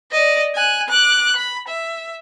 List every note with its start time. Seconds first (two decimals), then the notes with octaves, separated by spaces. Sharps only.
0.11 D5 D#5
0.54 G#5 F#6
0.89 D6 F#6
1.36 B5
1.68 E5